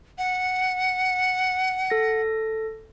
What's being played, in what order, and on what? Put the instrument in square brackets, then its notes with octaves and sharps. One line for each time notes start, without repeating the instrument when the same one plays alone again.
[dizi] F#5
[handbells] A4 A#6